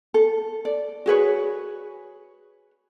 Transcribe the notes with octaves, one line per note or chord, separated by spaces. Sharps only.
A4
D5
F#4 G#4 B4 C#5